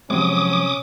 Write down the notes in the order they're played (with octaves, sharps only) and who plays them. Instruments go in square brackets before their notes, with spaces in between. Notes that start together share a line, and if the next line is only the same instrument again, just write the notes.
[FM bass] C3 [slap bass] F3 F#3 G#3 [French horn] C#4 [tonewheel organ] D6 D#6